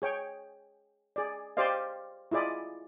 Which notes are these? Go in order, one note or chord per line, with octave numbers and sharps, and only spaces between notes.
G#4 C#5 G5
G#4 D5
G4 C5 D5 D#5 F5
E4 F4 G#4 D5 D#5